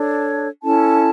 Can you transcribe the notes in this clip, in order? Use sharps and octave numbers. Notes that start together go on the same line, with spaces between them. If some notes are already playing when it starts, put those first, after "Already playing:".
Already playing: D4 A4 C#5
C#4 E4 A4 A5